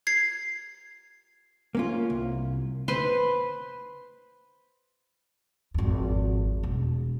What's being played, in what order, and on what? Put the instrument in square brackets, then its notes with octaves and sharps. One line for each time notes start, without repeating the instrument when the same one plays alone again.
[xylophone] G#6 C7
[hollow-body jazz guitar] A#3 C#4 F4
C2
[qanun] B4 C5 C6
[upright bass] G#1 F2
E1